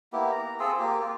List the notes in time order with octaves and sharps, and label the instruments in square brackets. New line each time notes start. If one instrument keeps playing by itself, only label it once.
[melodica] A#3 B3 E4 G4
A#5
C4 F4 G#4 A4
A#3 G4
F4